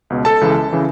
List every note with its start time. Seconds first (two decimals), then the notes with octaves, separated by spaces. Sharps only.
0.10 C#2 B2
0.25 A4 A5
0.41 C#2 C#3 E3
0.73 C#3 E3